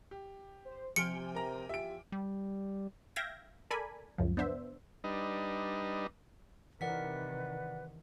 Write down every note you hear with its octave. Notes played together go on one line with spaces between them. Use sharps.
G4
C5
C3 F3 G4 G#5 F6 C#7 D7
A#4 A#5
E2 F4 G4 E5 D7
G3
E5 F5 G5 G6 G#6 A#6
A4 A#4 D5 G#5 B5
C#2 F#2 F3
B3 D4 C5 E5
G3 D4 D#4 B4 D#5
C3 D#3 E3 A#4 B4 D5 F#5 B6